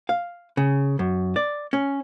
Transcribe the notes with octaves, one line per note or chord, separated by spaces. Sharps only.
F5
C#3
F#2
D5
C#4